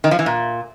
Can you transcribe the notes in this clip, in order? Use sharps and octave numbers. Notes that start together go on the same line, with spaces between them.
D#3
F3
E3
A#2